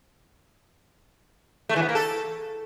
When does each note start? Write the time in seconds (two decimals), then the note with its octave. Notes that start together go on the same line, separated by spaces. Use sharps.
1.69 A3
1.76 E3
1.82 B3
1.89 A#3
1.95 A4